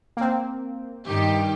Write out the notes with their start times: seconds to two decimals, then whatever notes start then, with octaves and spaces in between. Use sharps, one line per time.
0.17 A#3 C4
1.07 G2 D#3 G4